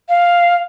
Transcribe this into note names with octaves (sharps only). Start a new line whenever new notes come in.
F5